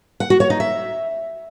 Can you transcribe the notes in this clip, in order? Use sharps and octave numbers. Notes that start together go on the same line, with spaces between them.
F#5
F#4
C#5
D#4
E5